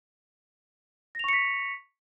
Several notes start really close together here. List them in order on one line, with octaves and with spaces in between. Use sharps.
A#6 F7 C#6 C#7 B6